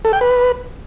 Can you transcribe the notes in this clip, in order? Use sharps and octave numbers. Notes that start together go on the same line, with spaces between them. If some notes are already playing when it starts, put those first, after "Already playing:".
A4
G5
B4